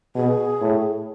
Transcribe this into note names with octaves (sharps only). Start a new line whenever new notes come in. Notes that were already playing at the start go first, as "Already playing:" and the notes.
B2 G#4
A2